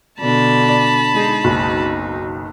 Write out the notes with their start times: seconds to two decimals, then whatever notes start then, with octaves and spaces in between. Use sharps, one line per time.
0.20 B2 D3 D4 A5 B5
0.69 D5
1.14 G#3 D#4 G#4
1.44 F#1 B1 D#4